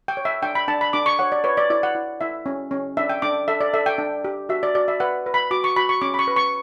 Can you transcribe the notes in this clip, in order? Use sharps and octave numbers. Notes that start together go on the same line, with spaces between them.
G5
C#5
E5
D4 G5
B5
D4 A5
B5
D4 D6
C#6
C#5 F#5
D5
B4 C#5
D5
E4 D5
F#5
E4
E4 E5
C#4
C#4
D4 E5
G5
D4 D6
A4 E5
D5
A4 E5
G5
D4
G4
F#4 E5
D5
F#4 D5
E5
B4 F#5
B4
B5
F#4 D6
C#6
F#4 B5
C#6
C#4 D6
B5
C#6
B4
C#6